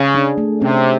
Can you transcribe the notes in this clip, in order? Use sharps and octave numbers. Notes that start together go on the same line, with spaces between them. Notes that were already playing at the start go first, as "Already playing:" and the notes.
Already playing: C#3 G#4
D4
A3
C3 C#4